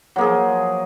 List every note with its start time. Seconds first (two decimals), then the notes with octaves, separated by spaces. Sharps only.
0.16 F#3
0.18 A#3
0.21 G#4
0.23 F3